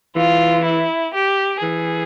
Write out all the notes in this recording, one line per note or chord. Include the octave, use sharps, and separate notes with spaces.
E3 F4
E4
G4
E3 G#4